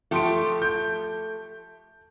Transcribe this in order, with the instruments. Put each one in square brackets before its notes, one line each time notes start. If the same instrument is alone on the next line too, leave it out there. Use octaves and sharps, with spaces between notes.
[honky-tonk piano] F3 C6 D7 [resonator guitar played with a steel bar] A3 G4
[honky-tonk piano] G6